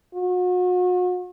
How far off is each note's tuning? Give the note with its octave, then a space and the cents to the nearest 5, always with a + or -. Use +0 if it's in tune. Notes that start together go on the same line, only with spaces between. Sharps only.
F#4 -40